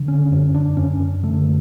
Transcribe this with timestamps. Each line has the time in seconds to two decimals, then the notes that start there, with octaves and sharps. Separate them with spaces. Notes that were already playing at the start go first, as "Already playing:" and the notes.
Already playing: D3
0.08 C#4
0.31 F#2 C#4
0.54 D4
0.77 F#2 C#4
1.23 D3 A3